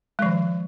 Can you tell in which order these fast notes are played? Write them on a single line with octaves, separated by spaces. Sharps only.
G#3 F3 D#3